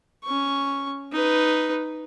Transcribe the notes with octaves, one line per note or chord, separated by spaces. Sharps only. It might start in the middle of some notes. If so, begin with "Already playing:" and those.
C#4 C#6
D#4 B4